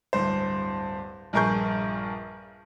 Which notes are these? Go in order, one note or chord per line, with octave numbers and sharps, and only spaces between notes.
D1 G2 C5
A#1 G2 G#4 A#4 C#6 G6